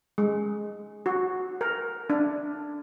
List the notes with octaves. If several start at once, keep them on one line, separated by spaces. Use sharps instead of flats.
G#3
F#4
A#4
D4